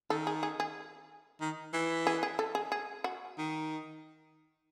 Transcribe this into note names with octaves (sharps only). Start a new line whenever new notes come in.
D#3 A4
G#4
G#4
G#4
D#3
E3
G#4
G#4
A4
G#4
G#4
F#4
D#3